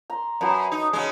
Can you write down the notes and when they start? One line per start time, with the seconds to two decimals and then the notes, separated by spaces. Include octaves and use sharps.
0.10 A#5 C6
0.41 F#2 F#3 B4 A5
0.72 D#4
0.93 C#3 G#3